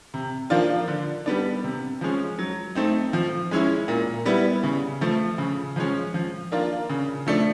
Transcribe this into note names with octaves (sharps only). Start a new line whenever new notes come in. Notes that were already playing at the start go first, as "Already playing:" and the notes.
C3
F3 A#3 D4 F4
D3
G3 B3 D4
C3
F3 G#3 C#4
F#3
A3 C4 D#4
F3
G#3 C#4 E4
A#2
G3 B3 E4
C#3
F3 A3
C#3
F3 G#3 C#4
F3
A#3 D4 F4
C#3
F3 A3 D4